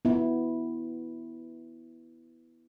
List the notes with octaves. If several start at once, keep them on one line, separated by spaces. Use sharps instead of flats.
B3 E4